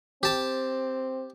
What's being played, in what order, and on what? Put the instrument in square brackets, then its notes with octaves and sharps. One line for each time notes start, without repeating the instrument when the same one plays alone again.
[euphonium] C4 [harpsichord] G4 A5